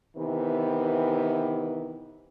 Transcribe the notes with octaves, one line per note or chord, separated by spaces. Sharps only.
C3 D#3 E3 B3